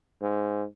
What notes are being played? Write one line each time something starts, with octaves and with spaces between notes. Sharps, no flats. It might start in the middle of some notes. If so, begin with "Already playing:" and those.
G#2